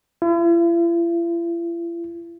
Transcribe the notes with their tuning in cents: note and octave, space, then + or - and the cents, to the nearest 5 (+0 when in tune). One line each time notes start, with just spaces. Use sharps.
E4 +45